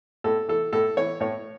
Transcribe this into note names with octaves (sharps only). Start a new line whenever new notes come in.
A2 A4
E3 A4
A2 A4
E3 C#5
A2 C#5